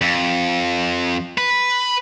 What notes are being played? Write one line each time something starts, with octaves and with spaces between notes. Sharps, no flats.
F2
B4